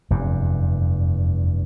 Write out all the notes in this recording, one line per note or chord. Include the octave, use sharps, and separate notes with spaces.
F1 E2 G2